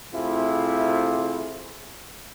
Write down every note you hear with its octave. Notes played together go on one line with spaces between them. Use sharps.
C3 A3 E4 F4 G#4